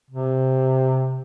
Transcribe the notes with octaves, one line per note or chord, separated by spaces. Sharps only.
C3